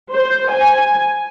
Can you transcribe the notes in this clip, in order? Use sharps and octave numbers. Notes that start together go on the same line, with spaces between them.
C5
G#5